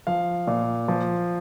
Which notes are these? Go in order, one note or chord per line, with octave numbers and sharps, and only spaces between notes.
F3 F5
A#2
F3